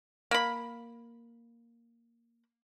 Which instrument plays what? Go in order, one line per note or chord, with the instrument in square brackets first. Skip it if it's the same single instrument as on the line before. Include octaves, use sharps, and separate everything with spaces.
[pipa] A#3 B5